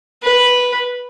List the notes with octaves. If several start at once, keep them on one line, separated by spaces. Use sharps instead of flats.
B4